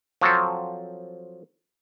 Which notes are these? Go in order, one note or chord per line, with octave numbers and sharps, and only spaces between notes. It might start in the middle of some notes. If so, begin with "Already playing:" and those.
F3 F#3 C4 A4